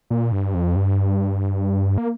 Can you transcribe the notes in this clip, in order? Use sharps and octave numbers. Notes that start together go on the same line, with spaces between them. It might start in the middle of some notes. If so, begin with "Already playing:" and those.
A#2
G2
F2
G2
A#3